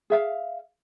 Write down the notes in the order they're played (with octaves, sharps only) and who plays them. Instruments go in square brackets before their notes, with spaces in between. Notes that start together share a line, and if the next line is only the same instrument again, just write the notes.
[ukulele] G#4 E5 F5